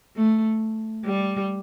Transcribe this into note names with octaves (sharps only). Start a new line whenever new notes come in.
A3
G3